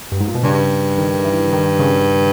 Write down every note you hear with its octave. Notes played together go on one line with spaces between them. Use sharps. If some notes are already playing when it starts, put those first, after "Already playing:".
G2
G#2
A#2
B2
G2 C#3
D#3
E3
D#3
C#3